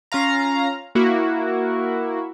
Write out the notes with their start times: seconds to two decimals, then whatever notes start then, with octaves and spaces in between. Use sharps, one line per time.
0.12 C#4 F4 F5 A#5
0.95 A#3 E4 F#4